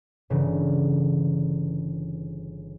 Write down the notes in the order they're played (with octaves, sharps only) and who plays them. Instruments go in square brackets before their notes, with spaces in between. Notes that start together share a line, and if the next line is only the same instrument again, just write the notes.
[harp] G1 C#3 E3